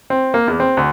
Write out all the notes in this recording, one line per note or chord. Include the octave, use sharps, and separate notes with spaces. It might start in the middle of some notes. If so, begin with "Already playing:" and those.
C4
A#3
E2
C4
D2